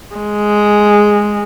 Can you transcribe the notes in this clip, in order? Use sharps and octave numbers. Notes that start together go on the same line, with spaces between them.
G#3